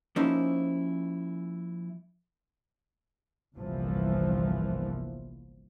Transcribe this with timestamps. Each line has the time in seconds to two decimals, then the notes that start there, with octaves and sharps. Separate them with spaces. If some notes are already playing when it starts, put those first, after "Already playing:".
0.16 F3 A#3 C#4 D#4 E4 C5
3.56 G1 C2 A#2 E3 F3